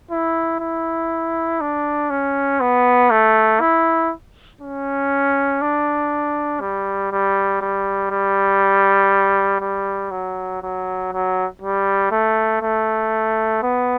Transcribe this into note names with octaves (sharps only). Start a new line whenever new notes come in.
E4
E4
D4
C#4
B3
A3
E4
C#4
D4
G3
G3
G3
G3
G3
F#3
F#3
F#3
G3
A3
A3
B3